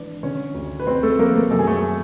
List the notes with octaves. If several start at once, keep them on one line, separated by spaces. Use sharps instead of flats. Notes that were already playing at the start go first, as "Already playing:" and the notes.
Already playing: G#1 E3 D4
D3 C#4 C#5
D2
B4
D2 C4 C5
A3 A4
F3 A#3 A#4
A3 A4
F#2 A4
G#4
A3 A4